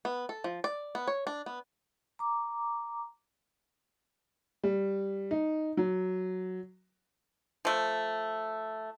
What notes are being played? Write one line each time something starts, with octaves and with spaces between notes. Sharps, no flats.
B3
A4
F3
D5
B3
C#5
D4
B3
A#5 D6
G3
D#4
F#3
F3 A3